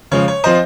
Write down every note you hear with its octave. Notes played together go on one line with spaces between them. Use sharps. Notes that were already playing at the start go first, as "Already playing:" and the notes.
C#3 F3 G#3 C#5
C#5
F3 C4 C5 D#5